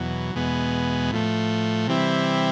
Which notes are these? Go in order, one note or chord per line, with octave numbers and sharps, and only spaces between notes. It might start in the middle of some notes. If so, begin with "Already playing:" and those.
Already playing: E2 B2 F#3
E2 B2 G#3 B3
A2 F3 A3
C3 E3 G3 C4 E4